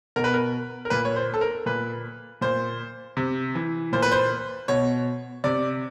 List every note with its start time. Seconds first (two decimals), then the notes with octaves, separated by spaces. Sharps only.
0.16 B2 A#4
0.24 B4
0.34 A#4
0.85 A#4
0.90 A#2 B4
1.05 C#5
1.16 C5
1.34 A4
1.41 A#4
1.66 A#2 B4
2.41 A#2 C5
3.17 C3
3.55 E3
3.92 A#2 C5
4.02 B4
4.12 C5
4.68 B2 C#5
5.44 C3 D5